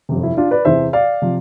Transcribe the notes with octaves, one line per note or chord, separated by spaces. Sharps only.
G1 F2 C3
E4
D4 F4
B4 D5
E2 C3 E3 C5 E5
D5 F5
C3 F3